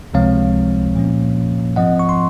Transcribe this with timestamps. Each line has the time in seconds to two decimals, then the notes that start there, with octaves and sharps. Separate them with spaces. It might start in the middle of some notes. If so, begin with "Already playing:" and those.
0.14 C#2 C3 F3 G#3 C4 C#5 F5
0.96 A#2 F3 A#3 C#4
1.76 G#2 F3 C4 D#5 F#5
1.99 C#6
2.09 C6